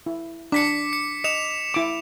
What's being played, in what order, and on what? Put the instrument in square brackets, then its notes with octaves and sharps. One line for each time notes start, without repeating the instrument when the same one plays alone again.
[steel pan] E4
[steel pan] D4 [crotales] D6 B6 C#7
[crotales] C#7
[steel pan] D#5 [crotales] C#7 E7 F7
[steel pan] E4 D6